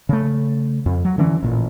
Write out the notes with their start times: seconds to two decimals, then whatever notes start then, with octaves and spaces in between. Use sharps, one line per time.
0.09 C#3 A3
0.86 F2
1.05 F#3
1.18 D3 E3 B3 C#4
1.43 A1 A#2